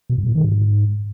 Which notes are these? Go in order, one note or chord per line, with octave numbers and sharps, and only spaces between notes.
B2
G2
A#2
D#3
G#2